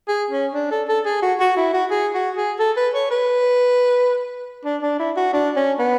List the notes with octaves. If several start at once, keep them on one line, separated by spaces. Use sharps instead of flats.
G#4
C#4
D4
A4
A4
G#4
F#4
F#4
E4
F#4
G#4
F#4
G#4
A4
B4
C#5
B4
D4
D4
E4
F#4
D4
C#4
B3